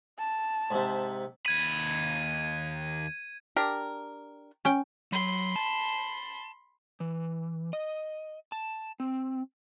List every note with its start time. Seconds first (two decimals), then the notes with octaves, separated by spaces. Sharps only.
0.18 A5
0.71 G#2 C3
1.46 D#2 B5 G#6 D#7
3.56 D4 G4 A#4
4.65 C#4 G5
5.12 F#3 B5 C6
5.56 A5
7.00 E3
7.73 D#5
8.52 A5
9.00 C4